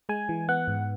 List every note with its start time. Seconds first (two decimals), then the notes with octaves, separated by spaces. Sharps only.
0.09 G#3 G#5
0.29 E3
0.48 B3 F#5
0.68 G#2